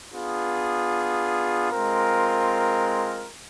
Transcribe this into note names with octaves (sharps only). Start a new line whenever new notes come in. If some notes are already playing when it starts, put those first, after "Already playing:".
B3 D4 F4 G#4
G#3 C4 F4 A#4